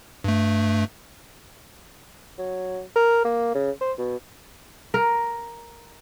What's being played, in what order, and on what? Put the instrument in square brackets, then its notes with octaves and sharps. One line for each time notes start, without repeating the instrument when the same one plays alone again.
[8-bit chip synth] G2 A3
[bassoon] F#3
A#4
A#3
C#3
C5
B2
[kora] A#4